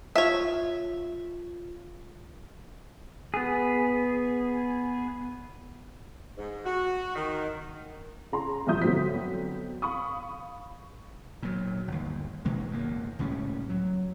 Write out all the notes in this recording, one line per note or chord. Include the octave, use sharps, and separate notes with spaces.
F4 C#5 E5
B3 G#4
G#2
F#4
D#3
C#3 A#5 C6
G2 B2 F3 E5 D#6 G6
D3 F#3 B3 C4 B6
F5 B5 C#6 D#6
A#2 F#3
G1 D#2
B2 D#3 G#3 A#3
F#1 E2 C#3 A#3
C#2 A2 G3 C#4
F#3